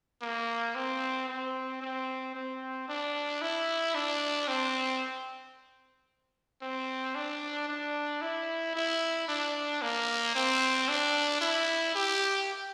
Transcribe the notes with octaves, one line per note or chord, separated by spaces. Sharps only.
A#3
C4
C4
C4
C4
D4
E4
D4
C4
C4
D4
D4
E4
E4
D4
A#3
C4
D4
E4
G4